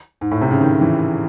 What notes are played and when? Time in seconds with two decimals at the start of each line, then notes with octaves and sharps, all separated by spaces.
0.21 G#2
0.31 A2
0.41 C3
0.51 C#3
0.61 D#3
0.81 E3